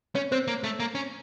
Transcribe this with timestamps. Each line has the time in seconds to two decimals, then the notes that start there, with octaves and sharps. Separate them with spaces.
0.15 C#4 C#5
0.32 C4 C5
0.48 A#3
0.64 A3
0.80 A#3
0.95 C#4